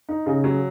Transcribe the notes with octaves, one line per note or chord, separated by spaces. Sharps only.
D#4
C#3
F#3